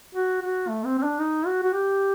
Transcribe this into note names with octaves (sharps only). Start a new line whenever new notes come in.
F#4
F#4
A3
C4
C4
D4
D#4
F#4
F#4
G4